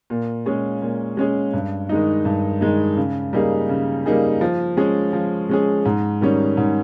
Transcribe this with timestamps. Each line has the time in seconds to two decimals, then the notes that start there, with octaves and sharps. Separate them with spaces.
0.10 A#2
0.46 G#3 C#4 G#4
0.82 A#2
1.17 G#3 C#4 G#4
1.53 G2
1.89 D#3 G#3 D#4
2.25 G2
2.61 D#3 G#3 D#4
2.97 C#3
3.33 G3 A#3 D#4 G#4
3.69 C#3
4.06 G3 A#3 D#4 G#4
4.41 F3
4.77 G#3 C#4 G#4
5.13 F3
5.49 G#3 C#4 G#4
5.85 G#2
6.21 D#3 G3 C#4
6.57 G#2